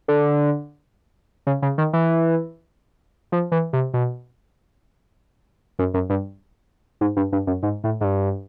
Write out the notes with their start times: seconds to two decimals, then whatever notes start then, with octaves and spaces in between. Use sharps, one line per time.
0.08 D3
1.47 C#3
1.62 C#3
1.78 D#3
1.93 E3
3.32 F3
3.52 E3
3.73 C3
3.94 B2
5.79 F#2
5.94 F#2
6.10 G2
7.01 G#2
7.17 G2
7.32 G2
7.47 F#2
7.63 G#2
7.84 A2
8.01 G#2
8.04 G2